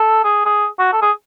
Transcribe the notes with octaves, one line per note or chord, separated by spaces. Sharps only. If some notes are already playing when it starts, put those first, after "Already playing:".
Already playing: A4
G#4
G#4
F#4
A4
G#4